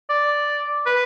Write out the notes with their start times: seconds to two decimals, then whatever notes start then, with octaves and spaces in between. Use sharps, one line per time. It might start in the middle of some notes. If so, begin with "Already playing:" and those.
0.10 D5
0.86 B4